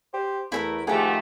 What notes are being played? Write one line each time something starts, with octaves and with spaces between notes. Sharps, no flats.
G4 C5
E2 A3 E4 A4 A#4
G#2 D#3 F3 A3 G4 G#4 F#5